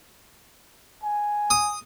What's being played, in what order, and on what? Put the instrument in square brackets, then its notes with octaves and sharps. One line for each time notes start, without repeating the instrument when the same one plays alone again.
[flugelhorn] G#5
[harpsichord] D#6